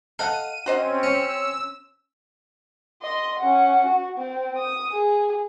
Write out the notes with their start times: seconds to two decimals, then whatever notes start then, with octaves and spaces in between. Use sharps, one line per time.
0.19 A4 D#5 F5 F#5 D#7
0.66 C4 C#4 F#4 C5 D#5
1.03 C#4 E6
3.02 D#5 C6
3.39 C#4 F#5
3.86 F#4
4.18 C4
4.58 D#6
4.92 G#4